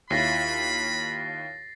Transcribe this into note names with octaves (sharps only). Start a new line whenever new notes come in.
D#2 E4 F4 C#5 B5 A6 A#6 C7